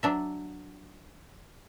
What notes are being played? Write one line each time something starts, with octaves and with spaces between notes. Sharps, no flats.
F#3 D4 E5